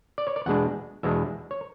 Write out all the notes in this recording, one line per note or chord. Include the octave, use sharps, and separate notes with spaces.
D5
C#5
D5
E2 B2 G#3 D4 F#5
E2 B2 G#3 D4 E5
C#5